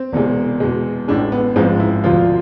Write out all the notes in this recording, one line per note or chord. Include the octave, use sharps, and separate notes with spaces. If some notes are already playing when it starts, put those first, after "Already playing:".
Already playing: C4
E1 E2 C3 G#3
E2 B2 G#3
A1 A2 G#3 D4
B3
A1 G#2 F3 G#3 C4
E4
E1 D2 C3 F3 F4